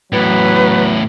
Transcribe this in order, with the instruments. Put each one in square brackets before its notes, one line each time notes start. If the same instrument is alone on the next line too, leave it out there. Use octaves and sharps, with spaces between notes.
[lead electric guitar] E2 A2 [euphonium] F#3 [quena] B4